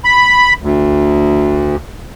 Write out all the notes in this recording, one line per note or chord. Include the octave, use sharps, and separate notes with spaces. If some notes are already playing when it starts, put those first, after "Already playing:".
B5
D2